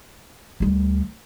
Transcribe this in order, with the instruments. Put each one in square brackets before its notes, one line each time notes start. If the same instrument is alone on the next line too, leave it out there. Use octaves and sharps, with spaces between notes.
[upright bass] D2 G3